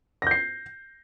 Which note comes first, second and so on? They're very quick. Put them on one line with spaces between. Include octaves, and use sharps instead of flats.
A#6 G6 C7